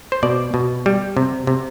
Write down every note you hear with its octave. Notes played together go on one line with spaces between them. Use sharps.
C5
B2 D5
B2
G3
C3
C3